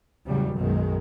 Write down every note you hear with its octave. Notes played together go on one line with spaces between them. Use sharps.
E2 A2 C#3 F#3 G3
B1 F#2 B2 D#3 G#3